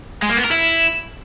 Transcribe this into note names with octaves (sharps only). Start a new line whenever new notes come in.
G#3
A#3
B3
A#4
E4